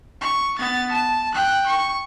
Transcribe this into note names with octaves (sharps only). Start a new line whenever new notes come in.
C#6
B3 A6
A5
G5 F#6
C#6